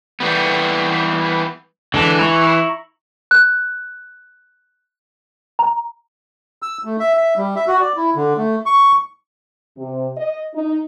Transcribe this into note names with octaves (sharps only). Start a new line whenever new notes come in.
E3 G3 B3
D3 E3 G#3 A5
E4 A#5 C#6
F#6
A#5
E6
A3
E5
E5
G3
E5
F#4
D5
E4
D3
A3
C#6
C3
D#5
D#4